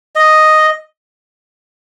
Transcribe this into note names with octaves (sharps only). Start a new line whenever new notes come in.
D#5